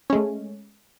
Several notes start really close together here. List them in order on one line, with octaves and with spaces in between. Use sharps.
C#4 G#3 A3